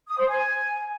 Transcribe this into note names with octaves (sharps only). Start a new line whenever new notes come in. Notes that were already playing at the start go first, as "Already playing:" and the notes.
D#6
C5
G#5